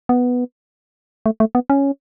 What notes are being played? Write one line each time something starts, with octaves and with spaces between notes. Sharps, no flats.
B3
A3
A3
B3
C#4